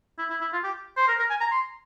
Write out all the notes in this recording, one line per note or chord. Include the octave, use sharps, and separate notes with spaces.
E4
E4
E4
F4
G4
C5
A#4
A#4
G#5
A#5
C6